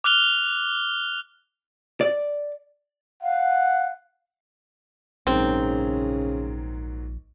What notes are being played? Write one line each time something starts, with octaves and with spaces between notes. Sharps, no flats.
D6 F6 F#6 F7 G7
D5
F5 F#5
A#1 G#2 C#3 F#3 A#3 C4